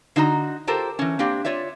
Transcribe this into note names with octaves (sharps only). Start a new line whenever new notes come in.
D3 D#4 F#4 A#5
F4 G4 A4 A#4 C5
E3 C#4
A#3 C4 D4 G4
F4 C#5 D5 E5